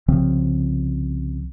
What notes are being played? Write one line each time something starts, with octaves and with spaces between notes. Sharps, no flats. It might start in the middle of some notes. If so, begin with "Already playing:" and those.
C2 C#3 F3 C4